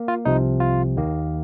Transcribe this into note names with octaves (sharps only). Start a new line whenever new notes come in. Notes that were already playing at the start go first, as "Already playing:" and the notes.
Already playing: A#3
F4
C2 C3 F3 D#4
F4
D#2 D#3 A#3